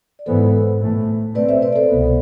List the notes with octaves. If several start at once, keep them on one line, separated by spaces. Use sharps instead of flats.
D5
G#2 E3 B3 A4 C5
A2 E3 A3
B2 A3 C4 B4 D5
C5 E5
B4 D5
D5
A4 C5
C2 B2 B3